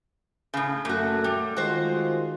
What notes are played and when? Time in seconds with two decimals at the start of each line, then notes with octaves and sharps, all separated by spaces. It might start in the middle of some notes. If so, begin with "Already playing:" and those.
0.54 A2 C#3
0.85 F#2 A#2 A3 F#4
1.24 G3
1.57 D#3 G#3 F4 F#4 C5